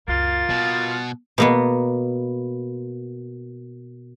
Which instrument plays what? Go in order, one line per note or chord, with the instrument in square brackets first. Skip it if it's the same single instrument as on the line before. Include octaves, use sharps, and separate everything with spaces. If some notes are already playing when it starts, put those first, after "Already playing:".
[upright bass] C#2 F#2 [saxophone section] A#3 F4 [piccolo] A6
[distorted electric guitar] B2 [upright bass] G3
[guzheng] B2 A#3 B3